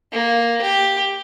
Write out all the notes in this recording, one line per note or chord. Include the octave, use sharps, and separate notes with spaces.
A#3
G4